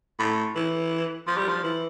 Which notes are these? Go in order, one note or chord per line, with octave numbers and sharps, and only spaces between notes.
A2
E3
F3
G3
F3
E3